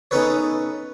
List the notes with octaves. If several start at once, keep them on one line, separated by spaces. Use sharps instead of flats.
B3 C#4 D#4 A4 B4 C#5